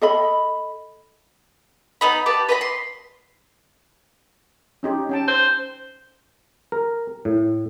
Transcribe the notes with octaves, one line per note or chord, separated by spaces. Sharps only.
A4 D#5 B5
B3 D#4 B5
G4 B4 A5
B4 D#5 A#5 B5
C6
C#4 D#4 G4
C#4 G5 A5
C5
A#4
A2